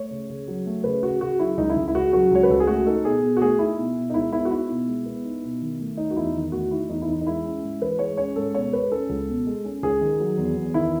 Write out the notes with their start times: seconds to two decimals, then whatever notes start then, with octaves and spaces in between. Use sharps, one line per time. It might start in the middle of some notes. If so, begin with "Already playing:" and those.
Already playing: A3 C#5
0.11 C#3
0.30 C#3
0.48 F#3
0.66 A3
0.84 C#3 B4
1.03 C#3 F#4
1.21 C#3 F#4
1.39 F#3 E4
1.57 C#2 D#4
1.70 E4
1.76 C#2
1.88 E4
1.94 C#3 F#4
2.13 F#3 F#4
2.31 C#2 C#5
2.43 B4
2.50 C#2 A4
2.60 G#4
2.67 A3 F#4
2.86 D#4 A4
3.04 B2 G#4
3.22 B2
3.37 F#4
3.41 A3 G#4
3.59 D#4 E4
3.77 B2
3.97 B2
4.10 D#4
4.14 G#3 E4
4.32 B3 E4
4.45 F#4
4.51 D#4 E4
4.69 B2
4.88 G#3
5.06 B3
5.25 D#4
5.43 B2
5.62 D#3
5.80 A3
5.97 D#4
6.11 F#4
6.16 E2 E4
6.34 D#3
6.52 A3 F#4
6.71 D#4 E4
6.89 E2 D#4
7.02 E4
7.07 E3 D#4
7.21 D#4
7.26 G#3 E4
7.45 C#4
7.63 G#2
7.81 E3 B4
7.99 G#3 C#5
8.17 C#4 C#5
8.36 G#2 A4
8.55 B2 C#5
8.73 G#3 B4
8.91 C#4 A4
9.09 C#2
9.28 B2
9.47 G#3
9.65 C#4
9.83 C#2 G#4
10.01 D#3
10.20 F#3
10.38 E2
10.56 E2
10.74 D#3 E4